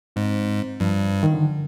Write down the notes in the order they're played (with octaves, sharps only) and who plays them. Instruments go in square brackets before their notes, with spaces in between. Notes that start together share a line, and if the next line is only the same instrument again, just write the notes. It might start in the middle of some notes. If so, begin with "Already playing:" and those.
[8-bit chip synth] G#2 [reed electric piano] C4
[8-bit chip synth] G2 [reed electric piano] F3
[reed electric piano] D#3
D3